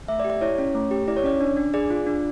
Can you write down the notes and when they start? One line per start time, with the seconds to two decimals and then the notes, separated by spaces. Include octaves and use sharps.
0.08 A3 E5
0.20 D5
0.24 G4
0.30 D5
0.41 E4 C#5
0.58 C#4
0.75 A3
0.91 G4
1.08 E4 D5
1.17 C#5
1.24 C#4 D5
1.41 D4
1.57 D4
1.74 G#4 D5
1.90 F4
2.07 D4